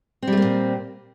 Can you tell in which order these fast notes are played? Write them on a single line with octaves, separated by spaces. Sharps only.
C4 G3 A3 A#3 A#2